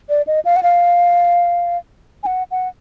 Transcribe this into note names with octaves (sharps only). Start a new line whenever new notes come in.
D5
D#5
F5
F#5
F5
G#5
F#5
F#5